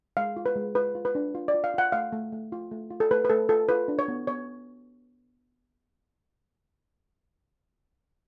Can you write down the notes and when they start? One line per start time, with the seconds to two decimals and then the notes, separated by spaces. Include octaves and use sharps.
0.17 G#3 F5
0.36 F4
0.46 B4
0.56 G#3
0.75 F4 B4
0.95 F4
1.05 B4
1.15 D4
1.35 F4
1.48 D5
1.54 F4
1.64 F5
1.74 F4 F#5
1.92 A3 F5
2.13 A3
2.32 A3
2.52 F4
2.71 A3
2.90 F4
3.00 A4
3.11 A3 B4
3.25 B4
3.29 A3 A4
3.49 F4 A4
3.69 F4 B4
3.88 D4
3.99 C#5
4.08 B3
4.27 B3 C#5